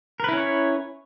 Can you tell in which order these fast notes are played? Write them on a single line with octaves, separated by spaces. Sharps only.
A#4 B4 E4 C#4 C#5